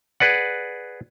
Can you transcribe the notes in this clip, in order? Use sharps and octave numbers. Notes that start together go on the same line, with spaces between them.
G#4 B4 D5 F#5